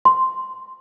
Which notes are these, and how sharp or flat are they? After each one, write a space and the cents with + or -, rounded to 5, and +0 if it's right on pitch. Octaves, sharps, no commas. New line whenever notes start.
C6 -5